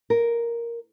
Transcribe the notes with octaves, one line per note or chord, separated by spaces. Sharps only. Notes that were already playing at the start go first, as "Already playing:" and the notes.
A#4